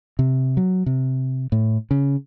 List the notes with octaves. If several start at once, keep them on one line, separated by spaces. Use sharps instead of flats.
C3
F#3
C3
A2
C#3